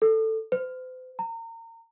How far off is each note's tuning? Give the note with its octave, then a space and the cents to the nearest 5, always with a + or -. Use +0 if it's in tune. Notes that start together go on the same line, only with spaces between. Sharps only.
A4 +10
C5 -40
A#5 -30